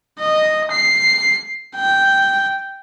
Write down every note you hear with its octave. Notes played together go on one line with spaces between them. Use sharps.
D#5
C7
G5